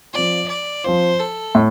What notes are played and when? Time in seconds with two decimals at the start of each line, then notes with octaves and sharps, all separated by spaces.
0.14 F3 C4 F4 D5
0.49 D5
0.84 F3 C4 F4 C5
1.19 A4
1.55 A2